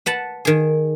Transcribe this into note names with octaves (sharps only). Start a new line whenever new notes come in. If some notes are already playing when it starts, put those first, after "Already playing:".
B4 F#5 A5
D#3 G#4